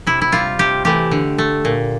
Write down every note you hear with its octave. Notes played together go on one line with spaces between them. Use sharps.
C3 E4
E4
G3 F4
C3 G4
E3 A3 G4
D3
A3
A#2